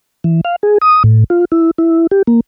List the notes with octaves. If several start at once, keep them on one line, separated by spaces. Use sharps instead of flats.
E3
F5
G#4
D#6
A2
F4
E4
E4
G4
A#3